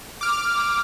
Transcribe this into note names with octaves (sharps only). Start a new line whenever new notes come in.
D6 F6